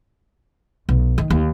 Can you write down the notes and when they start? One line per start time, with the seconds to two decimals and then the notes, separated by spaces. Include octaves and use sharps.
0.89 B1
1.18 D#3
1.30 D#2